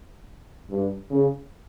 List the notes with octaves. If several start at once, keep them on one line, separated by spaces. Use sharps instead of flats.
G2
C#3